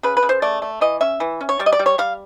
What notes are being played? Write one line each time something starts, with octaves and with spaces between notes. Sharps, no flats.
C#3 B4
B4
C#3
C5
A3 D5
A3
E3 D#5
C#4 E5
E3
C#4
C#5
G3 D5
D#5
D5
G3
C#5
G3 F5